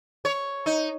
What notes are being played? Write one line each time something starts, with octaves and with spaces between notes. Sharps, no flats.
C#5
D#4